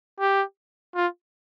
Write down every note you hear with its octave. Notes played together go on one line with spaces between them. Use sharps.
G4
F4